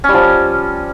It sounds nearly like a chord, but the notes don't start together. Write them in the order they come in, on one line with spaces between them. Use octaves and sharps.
C#4 G3 F3